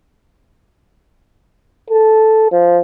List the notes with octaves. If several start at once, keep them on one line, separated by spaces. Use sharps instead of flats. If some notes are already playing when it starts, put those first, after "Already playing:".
A4
F3